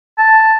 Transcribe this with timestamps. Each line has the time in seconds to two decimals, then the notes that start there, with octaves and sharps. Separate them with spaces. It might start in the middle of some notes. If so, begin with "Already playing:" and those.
0.18 A5